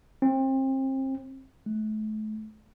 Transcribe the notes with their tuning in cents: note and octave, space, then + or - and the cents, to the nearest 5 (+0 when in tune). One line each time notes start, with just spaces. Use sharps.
C4 +30
A3 -35